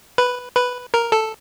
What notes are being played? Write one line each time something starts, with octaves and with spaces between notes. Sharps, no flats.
B4
B4
A#4
A4